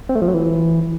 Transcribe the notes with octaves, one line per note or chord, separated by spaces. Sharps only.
C4
A3
F3
F#3
E3